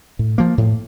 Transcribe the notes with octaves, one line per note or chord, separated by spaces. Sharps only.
A2
F3 A#3
A2